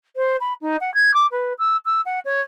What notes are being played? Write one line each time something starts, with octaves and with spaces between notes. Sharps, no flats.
C5
B5
D#4
F#5
G#6
D6
B4
E6
E6
F#5
C#5